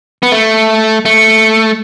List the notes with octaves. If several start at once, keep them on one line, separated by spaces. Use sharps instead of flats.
B3
A3
A3